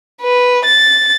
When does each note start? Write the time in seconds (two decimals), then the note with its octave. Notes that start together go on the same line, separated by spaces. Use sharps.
0.22 B4
0.65 A6